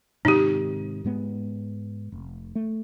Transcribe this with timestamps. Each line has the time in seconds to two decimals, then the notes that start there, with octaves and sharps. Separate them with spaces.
0.25 G#2 C3 D#3 D#4 G4
1.04 G#2 G#3 B3
2.12 F1
2.55 A3